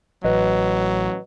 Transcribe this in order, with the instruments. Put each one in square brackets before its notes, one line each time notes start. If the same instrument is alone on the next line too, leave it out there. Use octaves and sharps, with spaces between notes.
[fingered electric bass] A1 [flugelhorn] F#3 [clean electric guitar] B4 D#5